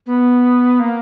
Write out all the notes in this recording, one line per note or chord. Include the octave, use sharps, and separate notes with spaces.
B3
A#3